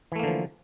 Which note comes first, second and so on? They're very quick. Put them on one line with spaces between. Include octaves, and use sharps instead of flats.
E3 A3 A#3 D3 F3